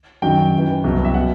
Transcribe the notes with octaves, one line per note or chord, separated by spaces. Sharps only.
F#2 D#3 F#3 G5
F#2 E3
C2 B2 F#3
E5
B2 F#3 F#5